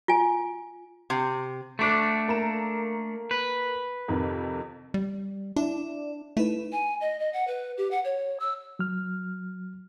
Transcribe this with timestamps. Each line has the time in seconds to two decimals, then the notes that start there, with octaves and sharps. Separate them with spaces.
0.08 F4 G#5
1.10 C3
1.79 A3 D4 C#6 D6 F#6
2.28 A#3 A#5 E7
3.31 B4
4.08 F2 C3 D#3
4.94 G3
5.56 D4 E4 D5
6.37 A3 D#4 E4 B4
6.72 G#5
7.01 D#5
7.20 D#5
7.33 F#5
7.47 B4
7.78 G4
7.91 F#5
8.05 C#5
8.40 E6
8.79 F#3 F6